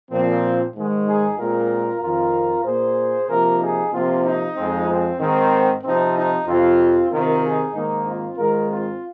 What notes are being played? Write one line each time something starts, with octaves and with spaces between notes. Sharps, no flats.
A#2 F3 C4
G#2 D#3 G#3
D#4 G#4
A#2 G#3 C4 F4 A#4
F2 D#3 C4 F4 A#4
A#2 A#3 G#4 C5
C3 F3 A#3 F4 A#4
D#4 G#4
C3 F3 A#3 C4 F4
D#4
F2 F3 G#3 C4
C4
G#2 D#3 C4
C3 F3 C4 D#4
D#4
F2 C3 F3 C4 F4
C3 D#3 C4 F4 A#4
D#4 G#4
G#2 D#3 A#3 D#4
C4 F4
G#2 D#3 G#3 F4 A#4
C4 F4